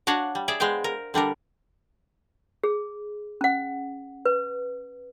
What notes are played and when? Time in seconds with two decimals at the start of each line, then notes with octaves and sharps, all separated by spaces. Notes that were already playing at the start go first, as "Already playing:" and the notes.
0.07 D4 F#4 C#5 F5 F#5
0.35 G3
0.48 G#4 D5 E5
0.60 G#3 B3 C5 F5 G5
0.84 A#4
1.14 D3 G3 D4 A#4
2.64 G#4
3.41 C#4 F#5
4.25 B4